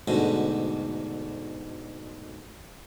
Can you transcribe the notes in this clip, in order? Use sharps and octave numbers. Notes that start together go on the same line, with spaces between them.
D2 G#2 B2 D3